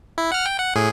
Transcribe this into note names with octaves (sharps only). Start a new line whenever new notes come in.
E4
F#5 F6
G5
F#5
A2 G#4